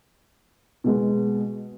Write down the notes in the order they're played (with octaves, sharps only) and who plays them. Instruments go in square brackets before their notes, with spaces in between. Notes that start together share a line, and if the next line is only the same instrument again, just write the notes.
[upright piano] B2 G#3 B3